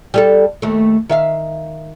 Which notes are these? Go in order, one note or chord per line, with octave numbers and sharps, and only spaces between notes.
G3 G#4 A4
D#2 A3
D#3 E5 F5